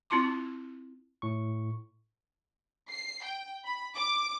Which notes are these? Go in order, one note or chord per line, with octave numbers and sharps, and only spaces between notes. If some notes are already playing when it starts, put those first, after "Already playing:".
C4 E4 F4 A5 C6 D6
A2 C#6
C7
G5
B5
D6